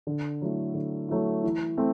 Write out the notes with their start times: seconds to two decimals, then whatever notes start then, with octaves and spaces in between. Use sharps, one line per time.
0.07 D3
0.42 F#3 A3 E4
0.75 D3
1.09 F#3 A3 E4
1.44 E3
1.77 A3 C4